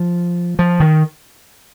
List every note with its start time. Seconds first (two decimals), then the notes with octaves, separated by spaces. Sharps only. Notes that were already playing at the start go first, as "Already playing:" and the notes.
Already playing: F3
0.59 F3
0.80 D#3